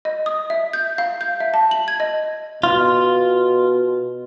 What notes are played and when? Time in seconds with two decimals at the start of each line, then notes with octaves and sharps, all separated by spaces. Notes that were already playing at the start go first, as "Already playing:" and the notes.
0.05 D#5
0.26 D#6
0.50 E5
0.73 G6
0.98 F5
1.21 G6
1.40 E5
1.54 A5
1.71 F#7
1.88 G#6
2.00 D#5
2.64 B2 F4